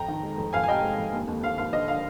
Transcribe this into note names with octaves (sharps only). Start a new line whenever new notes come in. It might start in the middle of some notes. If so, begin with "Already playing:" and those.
Already playing: F2 G5 A#5
D#3
G#3
F2
F2 F5 G#5
G#5
C3 D#5 G5
G#3
F2
D#2
D#2
D#2 F5
D#2 F5
D3 D#5
D3 F5